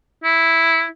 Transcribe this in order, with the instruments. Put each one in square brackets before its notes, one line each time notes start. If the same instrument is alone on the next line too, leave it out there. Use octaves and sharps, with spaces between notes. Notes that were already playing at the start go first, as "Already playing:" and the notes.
[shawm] E4